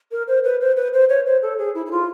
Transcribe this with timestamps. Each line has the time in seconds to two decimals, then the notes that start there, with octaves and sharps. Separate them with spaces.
0.11 A#4
0.28 C5
0.44 B4
0.61 C5
0.77 B4
0.93 C5
1.09 C#5
1.26 C5
1.42 A4
1.59 G#4
1.75 E4
1.86 E4
1.91 F4